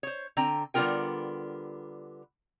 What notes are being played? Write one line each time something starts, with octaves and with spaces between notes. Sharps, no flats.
C5 C#5
D3 C4 G5 A#5
D3 G3 B3 F4 A#4 G5